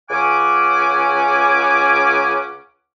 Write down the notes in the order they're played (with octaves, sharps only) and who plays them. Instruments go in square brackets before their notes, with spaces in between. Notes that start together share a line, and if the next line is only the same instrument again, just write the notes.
[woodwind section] C#2 C#3 C#4 F#5 G#5 D6